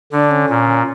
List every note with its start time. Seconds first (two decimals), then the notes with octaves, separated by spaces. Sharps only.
0.12 D3 D4
0.31 C#4
0.49 A#2